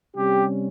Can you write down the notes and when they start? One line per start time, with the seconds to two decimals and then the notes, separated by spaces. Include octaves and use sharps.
0.15 C3 G3 C#4 G4